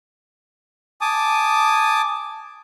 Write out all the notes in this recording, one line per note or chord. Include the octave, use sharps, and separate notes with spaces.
G#5 A5 D6 D#6